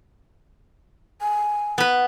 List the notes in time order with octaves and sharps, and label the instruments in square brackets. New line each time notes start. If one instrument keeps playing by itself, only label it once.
[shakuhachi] G#5
[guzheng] B3 B4